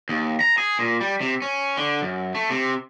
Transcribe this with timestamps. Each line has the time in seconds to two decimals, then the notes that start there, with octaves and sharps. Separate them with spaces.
0.09 D#2
0.41 A#5
0.58 G#4
0.79 A#2
1.01 G3
1.21 C3
1.42 C#4
1.77 D3
2.02 F#2
2.35 A3
2.50 C3